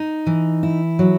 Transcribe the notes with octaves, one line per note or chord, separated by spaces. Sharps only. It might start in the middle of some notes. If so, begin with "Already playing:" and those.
Already playing: D#4
E3
E4
F#3